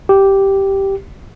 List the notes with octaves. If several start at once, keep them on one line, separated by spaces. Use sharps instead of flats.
G4